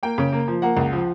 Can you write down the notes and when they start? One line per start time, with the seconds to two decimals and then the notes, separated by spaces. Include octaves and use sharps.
0.03 A#3 G5
0.18 C#3
0.33 A#3
0.48 F3
0.62 A#3 F#5
0.77 C#2
0.93 F3